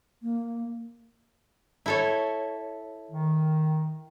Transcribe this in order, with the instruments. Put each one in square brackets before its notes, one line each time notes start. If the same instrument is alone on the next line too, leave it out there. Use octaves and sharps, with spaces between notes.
[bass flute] A#3
[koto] E4 A4 C#5
[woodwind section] D#3